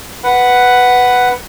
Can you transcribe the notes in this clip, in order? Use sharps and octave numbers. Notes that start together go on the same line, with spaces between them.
B4 F#5